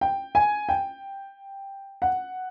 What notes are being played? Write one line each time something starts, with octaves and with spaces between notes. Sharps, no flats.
G5
G#5
G5
F#5